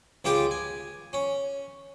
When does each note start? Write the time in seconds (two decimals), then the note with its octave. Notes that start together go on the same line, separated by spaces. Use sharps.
0.25 C#2 G#3 F4 G4 G#4 G5
0.51 G#5
1.13 C#4